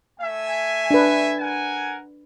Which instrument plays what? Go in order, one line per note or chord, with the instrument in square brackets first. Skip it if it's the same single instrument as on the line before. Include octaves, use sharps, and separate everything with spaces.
[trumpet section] A3 E5 G#5
[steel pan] D4 B4
[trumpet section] A#4 F#5 G#5